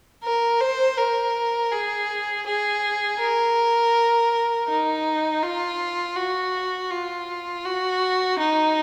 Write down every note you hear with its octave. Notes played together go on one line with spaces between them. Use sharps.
A#4
C5
A#4
G#4
G#4
A#4
D#4
F4
F#4
F4
F#4
D#4